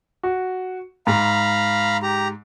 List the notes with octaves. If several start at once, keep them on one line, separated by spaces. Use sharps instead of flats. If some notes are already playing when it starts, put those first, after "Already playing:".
F#4
G#2 F5 A#5 B5
G4 A#5